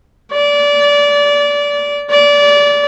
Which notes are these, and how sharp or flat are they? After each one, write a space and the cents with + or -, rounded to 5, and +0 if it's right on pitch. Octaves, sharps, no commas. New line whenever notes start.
D5 -25
D5 -25